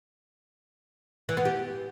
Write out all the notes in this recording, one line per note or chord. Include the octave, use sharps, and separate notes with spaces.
E3
B3
G4